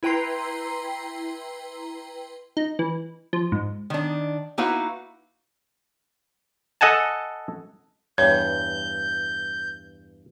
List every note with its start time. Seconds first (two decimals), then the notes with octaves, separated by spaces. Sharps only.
0.03 E4 B4 G5 A#5 C6 C7
2.57 D#4
2.79 E3
3.33 F3
3.52 G#2
3.90 D#3 D4
4.58 A#3 D#4 E4 F#4 B4 F5
6.81 A4 D#5 F#5 G#5 A5
8.18 E2 G2 C#5 G6